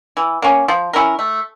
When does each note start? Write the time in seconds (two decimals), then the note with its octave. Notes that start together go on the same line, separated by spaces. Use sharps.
0.17 E3
0.42 A#3 C#4
0.68 F3
0.93 C#4 E4 A#4
1.19 A3